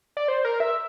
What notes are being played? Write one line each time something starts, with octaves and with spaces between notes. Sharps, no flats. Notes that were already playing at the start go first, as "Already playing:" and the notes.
D5
C5
A#4
E5